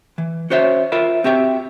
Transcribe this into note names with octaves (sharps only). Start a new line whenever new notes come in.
E3
C#4 F#4 C5 C#5 E5
F4 A#4 E5 B5
C4 F#4 G4 E5